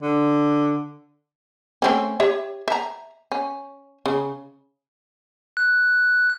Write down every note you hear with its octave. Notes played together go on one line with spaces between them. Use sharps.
D3
A3 C4 C#4
G4 C#5 E5
E5 A#5
C#4
C#3
F#6